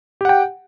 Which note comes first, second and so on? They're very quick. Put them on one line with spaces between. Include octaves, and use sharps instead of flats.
G4 F#5 G5